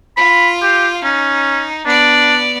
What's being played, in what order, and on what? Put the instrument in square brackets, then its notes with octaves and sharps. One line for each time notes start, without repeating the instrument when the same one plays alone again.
[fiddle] F4 F5 [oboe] B5
[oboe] G4
[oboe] C#4 [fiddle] D#4
[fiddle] B3 D5 [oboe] D4